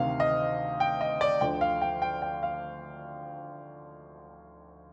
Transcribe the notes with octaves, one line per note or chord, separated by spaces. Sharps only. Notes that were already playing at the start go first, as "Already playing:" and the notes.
Already playing: D2 C3 D#3 F5
D#5
G5
D#5
D5
D2 D3 F3 G5
F5
G5
G5
G5
F5